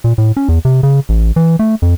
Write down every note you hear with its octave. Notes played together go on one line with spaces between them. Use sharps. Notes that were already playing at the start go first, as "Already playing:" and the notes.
A#2
A2
C#4
E2
C3
C#3
A1
E3
A3
F2